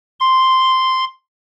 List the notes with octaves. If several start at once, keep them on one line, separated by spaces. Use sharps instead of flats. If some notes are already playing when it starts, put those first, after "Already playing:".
C6